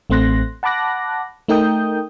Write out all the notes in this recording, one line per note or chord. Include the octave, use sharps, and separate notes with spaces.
A1 A3 C4 C6 F#6 A#6
F#5 A5 B5 D6 F#6 A#6
A3 D#4 A#4 G5 D#6 G6